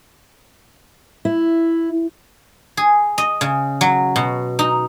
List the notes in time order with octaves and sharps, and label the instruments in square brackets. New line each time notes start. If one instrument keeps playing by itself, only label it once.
[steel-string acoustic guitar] E4
[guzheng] G#4
D#5
C#3
F#3
B2
D#4